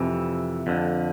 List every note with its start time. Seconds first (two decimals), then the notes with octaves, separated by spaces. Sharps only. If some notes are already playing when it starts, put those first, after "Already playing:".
Already playing: F2 C3 E3
0.67 F2 D3